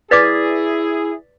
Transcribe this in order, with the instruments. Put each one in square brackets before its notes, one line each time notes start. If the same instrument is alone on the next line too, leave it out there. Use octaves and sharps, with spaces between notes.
[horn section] E4 G#4 [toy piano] B4 D5 D6 [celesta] A6 B6